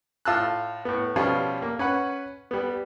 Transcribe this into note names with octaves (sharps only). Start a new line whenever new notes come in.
A2 F4 A5 E6 F#6
A2 B3
B2 F3 G3 C#4 F4
A#3
C#4 B4 F#5
G3 B3